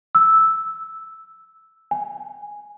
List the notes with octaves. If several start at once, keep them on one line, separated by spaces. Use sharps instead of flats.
E6
G#5